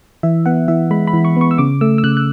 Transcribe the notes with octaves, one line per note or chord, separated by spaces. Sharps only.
E3 E5
B3 F#5
E3 E5
G#3 B5
B5
E3
C#6
B3 C#6
E6
C#3 D6
A3 E6
E6
C#3 F#6
F#6